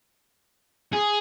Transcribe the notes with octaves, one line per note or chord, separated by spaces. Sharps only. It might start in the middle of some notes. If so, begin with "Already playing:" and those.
G#4